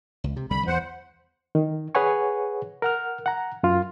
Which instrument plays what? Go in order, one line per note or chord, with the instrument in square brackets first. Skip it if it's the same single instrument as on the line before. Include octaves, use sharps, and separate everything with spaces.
[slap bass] C#2
C3
[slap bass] C2 D3 G3 [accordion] B5
[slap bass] E2 [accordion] C5 F#5
[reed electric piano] D#3
G#4 B4 C#5 F#5 G#5 C#6
A#4 F#5 F6
F#5 A#5
F#2 F4